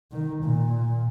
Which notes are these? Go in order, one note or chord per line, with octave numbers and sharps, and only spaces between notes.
D#3
A#2